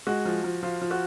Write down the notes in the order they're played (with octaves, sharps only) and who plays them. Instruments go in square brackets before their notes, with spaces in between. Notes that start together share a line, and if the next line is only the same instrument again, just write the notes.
[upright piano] G#3 [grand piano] F#4
[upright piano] F3
F3
[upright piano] F3 [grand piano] F4
[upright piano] F3
[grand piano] F#4